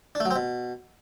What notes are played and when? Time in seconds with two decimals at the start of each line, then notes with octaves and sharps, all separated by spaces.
0.15 D4
0.20 A3
0.25 F#3
0.31 C4
0.36 B2